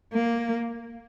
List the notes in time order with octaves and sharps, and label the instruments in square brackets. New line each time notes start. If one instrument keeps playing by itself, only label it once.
[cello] A#3